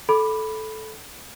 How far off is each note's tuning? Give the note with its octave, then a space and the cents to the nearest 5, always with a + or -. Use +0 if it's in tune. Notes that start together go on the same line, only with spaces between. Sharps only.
A4 -10 B5 +0 D6 +0